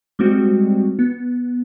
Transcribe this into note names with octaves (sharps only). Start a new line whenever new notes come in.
G3 G#3 C4 F#4
B3